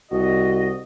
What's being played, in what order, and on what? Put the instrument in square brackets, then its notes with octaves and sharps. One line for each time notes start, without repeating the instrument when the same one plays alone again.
[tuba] C2 [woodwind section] F#4 D#5